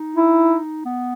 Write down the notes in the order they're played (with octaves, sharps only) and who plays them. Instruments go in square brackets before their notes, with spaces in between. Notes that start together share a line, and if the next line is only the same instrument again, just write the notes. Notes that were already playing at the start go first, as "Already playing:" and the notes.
Already playing: [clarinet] D#4
[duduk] E4
[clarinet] B3